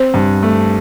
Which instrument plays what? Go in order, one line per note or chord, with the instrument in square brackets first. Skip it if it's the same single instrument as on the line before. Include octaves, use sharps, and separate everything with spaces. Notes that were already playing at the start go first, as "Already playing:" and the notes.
Already playing: [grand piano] C4 [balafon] C5
[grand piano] G2
A3